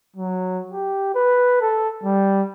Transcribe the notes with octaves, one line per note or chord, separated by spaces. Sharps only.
F#3
G4
B4
A4
G3